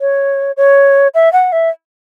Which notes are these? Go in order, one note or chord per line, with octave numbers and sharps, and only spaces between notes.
C#5
C#5
E5
F#5
E5